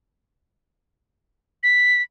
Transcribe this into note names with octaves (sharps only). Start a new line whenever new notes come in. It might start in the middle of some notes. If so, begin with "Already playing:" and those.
B6